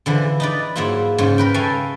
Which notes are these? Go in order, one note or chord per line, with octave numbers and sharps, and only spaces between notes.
D3 E3 F3
D#4 B4 D5
G#2 F#3 A#3 E4 F4
G#2 C#3
A#4 B4 G5
A4 C#5 E5 F5 G5 G#5